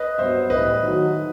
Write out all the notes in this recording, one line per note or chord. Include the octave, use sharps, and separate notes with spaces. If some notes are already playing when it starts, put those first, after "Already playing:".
Already playing: B4 D#5
G2 F#3 B3 C5 E5
A2 E3 G3 B4 D#5
D#3 F#3 A3 D#4 F#4